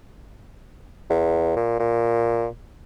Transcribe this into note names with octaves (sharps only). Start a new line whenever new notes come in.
E2
A#2
A#2